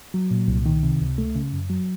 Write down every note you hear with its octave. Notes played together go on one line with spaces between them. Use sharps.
F#3
A#2
C2
D#3
C3
C#2
A3
C#3
F#2
F#3